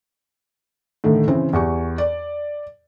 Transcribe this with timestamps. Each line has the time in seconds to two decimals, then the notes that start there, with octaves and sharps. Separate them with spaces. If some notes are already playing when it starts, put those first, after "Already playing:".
1.04 A2 D3 D#3
1.28 C#3 E3 C4
1.53 E2 G4 C#6
1.98 D5